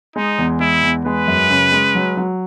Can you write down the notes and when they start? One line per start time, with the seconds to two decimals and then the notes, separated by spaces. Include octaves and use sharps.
0.16 G#3 D#4
0.38 E2
0.60 G#3 E4
0.83 E2
1.05 G#3 B4
1.27 F#2
1.50 C#3
1.72 G#3
1.95 F#3
2.17 F#3